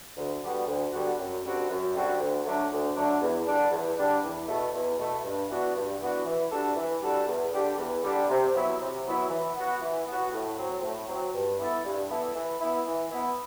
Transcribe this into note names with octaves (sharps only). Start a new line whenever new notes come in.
D2
D3 G3 B3 F#4
D2
D3 G3 B3 F#4
F#2
D3 G3 C4 F#4
F#2
D3 G3 C4 F#4
D2
D3 F#3 A3 D4
D2
D3 F#3 A3 D4
E2
D3 G3 D4
E2
D3 G3 D4
E2
B2 A3
E2
B2 A3
G2
E3 B3 D4 F#4
G2
E3 B3 D4 F#4
E3
G3 D4 F#4 A4
E3
G3 D4 F#4 A4
E2
D3 G3 D4 G4
E2
D3 G3 D4 G4
C3
F#3 B3 E4
C3
F#3 B3 E4
E3
B3 F#4
E3
B3 F#4
A2
F#3 C4
A2
F#3 C4
G2
E3 B3 E4 A4
G2
E3 B3 E4 A4
E3
B3 E4
E3
B3 E4